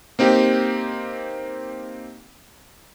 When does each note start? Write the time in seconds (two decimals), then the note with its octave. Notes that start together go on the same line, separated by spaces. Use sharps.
0.19 A#3 C4 D#4 G4